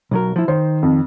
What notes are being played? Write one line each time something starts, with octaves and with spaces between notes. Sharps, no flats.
B1 F#3 A#4
F3 E4
D#3 C5
F2